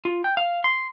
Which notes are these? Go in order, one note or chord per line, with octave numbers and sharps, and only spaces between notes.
F4
G5
F5
C6